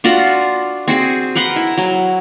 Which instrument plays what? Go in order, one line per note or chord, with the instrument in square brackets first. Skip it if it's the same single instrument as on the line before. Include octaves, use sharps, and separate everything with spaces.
[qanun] D4 F4 F#4 F#5
C4 F#4 G#4
A#4 B4 F#5 C6
E4
F#3